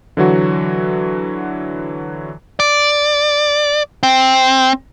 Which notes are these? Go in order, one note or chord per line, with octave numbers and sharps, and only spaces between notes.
D3 E3 F#3 F#4
D5
C4